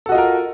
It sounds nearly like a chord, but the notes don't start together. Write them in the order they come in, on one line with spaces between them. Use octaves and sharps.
A4 F#4 D#5 F4 A#4